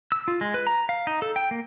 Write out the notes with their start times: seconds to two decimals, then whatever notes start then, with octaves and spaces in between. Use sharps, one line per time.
0.12 E6
0.28 F4
0.41 G#3
0.54 B4
0.67 A#5
0.89 F5
1.07 D#4
1.22 A4
1.36 G5
1.51 A#3